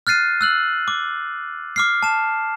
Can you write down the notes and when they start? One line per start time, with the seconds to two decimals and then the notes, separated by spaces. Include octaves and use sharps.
0.07 F6 F#6 A6 C7 D#7
0.41 E6 F#6 F#7
0.88 D6
1.76 D6 F6 C7
2.03 A5 E7